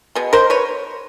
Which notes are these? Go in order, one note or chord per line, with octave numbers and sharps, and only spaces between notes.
B2 G#3 B3
A#4 C5
B4 C#5